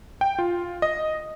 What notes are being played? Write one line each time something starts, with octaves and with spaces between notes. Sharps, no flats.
G5
F4
D#5